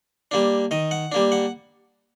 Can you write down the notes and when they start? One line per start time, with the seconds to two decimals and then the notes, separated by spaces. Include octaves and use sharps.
0.31 G3 A#3 D4
0.71 D#3 D#5
0.91 F#5
1.12 G3 A#3 D4
1.32 F#5